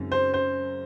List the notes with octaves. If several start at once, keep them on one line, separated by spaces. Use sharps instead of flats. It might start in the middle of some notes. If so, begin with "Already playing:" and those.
Already playing: F#2 C#3 G#3 C4 D#4
C5
C5